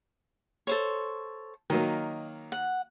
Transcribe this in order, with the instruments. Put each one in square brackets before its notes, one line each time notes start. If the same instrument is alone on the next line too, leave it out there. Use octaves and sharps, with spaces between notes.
[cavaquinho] A4 C5 C#5
[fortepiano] D#3 F#3 A#3 [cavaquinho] D#5
[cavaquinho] F#5